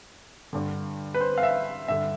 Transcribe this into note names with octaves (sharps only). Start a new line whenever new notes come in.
G2 D3
B4
C5
F5
E5
G2 D3 E5